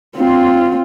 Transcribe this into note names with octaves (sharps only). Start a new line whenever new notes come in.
C4 F4